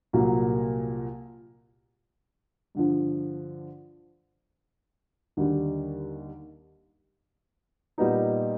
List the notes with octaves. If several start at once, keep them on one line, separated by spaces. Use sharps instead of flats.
C2 A#2 F#3 A#3
G2 D3 F3
D#2 D3 G3
A#2 G3 B3 D#4